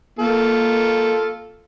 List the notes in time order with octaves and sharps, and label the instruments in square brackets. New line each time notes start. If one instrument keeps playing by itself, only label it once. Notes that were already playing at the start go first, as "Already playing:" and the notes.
[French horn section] A#3 [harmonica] F4 A4